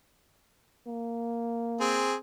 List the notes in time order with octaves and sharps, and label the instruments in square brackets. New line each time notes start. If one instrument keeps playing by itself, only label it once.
[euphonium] A#3
[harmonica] C4 G#4